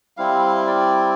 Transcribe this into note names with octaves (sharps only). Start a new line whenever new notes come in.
G3 C4 E4 F5
D5